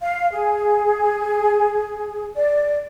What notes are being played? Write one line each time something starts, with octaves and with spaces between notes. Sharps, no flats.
F5
G#4
D5